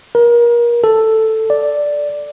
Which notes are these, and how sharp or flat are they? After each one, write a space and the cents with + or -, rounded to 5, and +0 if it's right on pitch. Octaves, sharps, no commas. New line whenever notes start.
A#4 +30
A4 +5
D5 +0